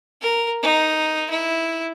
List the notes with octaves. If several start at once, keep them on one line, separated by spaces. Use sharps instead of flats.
A#4
D#4
E4